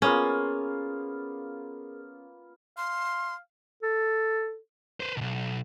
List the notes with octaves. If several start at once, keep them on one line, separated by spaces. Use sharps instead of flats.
A#3 B3 C#4 F4 G#4 A#4
F5 C6
A4
B4 C5
B1 B2